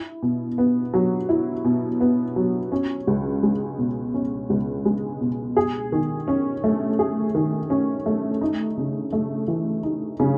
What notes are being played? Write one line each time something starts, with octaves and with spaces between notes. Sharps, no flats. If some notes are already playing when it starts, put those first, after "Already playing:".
Already playing: E4
B2
B3
F#3
E4
B2
B3
F#3
C#4
C#2
G#3
B2
C#4
C#2
G#3
B2
G#4
D#3
C#4
A3
G#4
D#3
C#4
A3
D#4
C#3
A3
E3
D#4
C#3